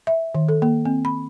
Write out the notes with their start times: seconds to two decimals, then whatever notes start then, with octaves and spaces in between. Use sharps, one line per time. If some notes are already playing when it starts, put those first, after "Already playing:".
0.07 E5
0.35 D#3
0.49 A4
0.62 A#3
0.85 C4
1.05 B5